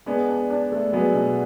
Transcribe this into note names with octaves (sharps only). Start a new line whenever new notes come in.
G#3 B3 D4
D4
D4
A3
F#3 G#3 B3
B2